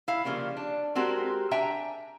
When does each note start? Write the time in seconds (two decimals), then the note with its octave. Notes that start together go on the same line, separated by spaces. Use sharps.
0.08 E4 F5
0.25 C#3 F3 G3 A#3 C#4
0.57 D4
0.95 G#3 C4 F#4 G4 A#4
1.51 D4 E5 G5 G#5 A#5